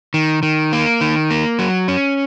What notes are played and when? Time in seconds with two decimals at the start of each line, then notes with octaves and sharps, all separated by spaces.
0.14 D#3
0.43 D#3
0.73 A#3
1.01 D#3
1.31 A#3
1.59 F#3
1.88 C#4